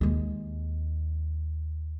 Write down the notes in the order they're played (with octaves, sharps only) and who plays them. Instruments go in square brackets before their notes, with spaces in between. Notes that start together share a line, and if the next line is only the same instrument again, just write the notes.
[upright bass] D#2 G#3